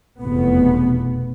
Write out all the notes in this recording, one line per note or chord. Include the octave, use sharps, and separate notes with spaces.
F1 E2 B2 B3